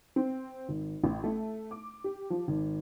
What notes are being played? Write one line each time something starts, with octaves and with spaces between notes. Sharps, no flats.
C4
G#1
A1
A3
D6
G4
F3
G#1